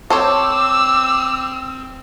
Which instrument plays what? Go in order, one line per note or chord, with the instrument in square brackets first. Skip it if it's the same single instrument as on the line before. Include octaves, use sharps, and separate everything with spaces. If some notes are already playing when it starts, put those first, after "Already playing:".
[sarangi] C4 [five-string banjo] A4 C5 C#5 [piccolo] D6 [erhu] E6